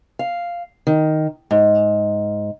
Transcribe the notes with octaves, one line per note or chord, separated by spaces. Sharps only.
F5
D#3
G#2